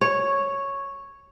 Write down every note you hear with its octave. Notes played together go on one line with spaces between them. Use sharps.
C#5